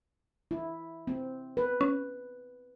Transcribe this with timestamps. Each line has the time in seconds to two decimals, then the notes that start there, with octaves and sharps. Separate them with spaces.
0.51 E4
1.07 C4
1.57 B4
1.81 C#4